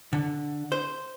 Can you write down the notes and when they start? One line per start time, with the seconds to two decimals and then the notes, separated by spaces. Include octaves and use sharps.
0.13 D3
0.72 C5